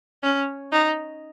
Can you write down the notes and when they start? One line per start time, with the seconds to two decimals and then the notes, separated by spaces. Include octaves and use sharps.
0.23 C#4
0.72 D#4